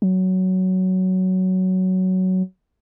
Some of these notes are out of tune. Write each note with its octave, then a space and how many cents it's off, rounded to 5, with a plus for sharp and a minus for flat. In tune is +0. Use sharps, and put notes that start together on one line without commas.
F#3 +10